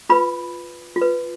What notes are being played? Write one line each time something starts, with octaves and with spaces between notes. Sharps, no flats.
F4 B4 B5
F4
B4